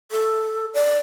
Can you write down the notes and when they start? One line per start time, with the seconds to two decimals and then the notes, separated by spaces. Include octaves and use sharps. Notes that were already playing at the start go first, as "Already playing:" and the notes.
0.11 A4
0.74 D5